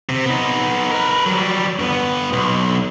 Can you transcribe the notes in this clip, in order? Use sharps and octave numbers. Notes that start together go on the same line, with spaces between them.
C3
B3 D#4
A#4 B4
F#3 G3
G2 B3
B1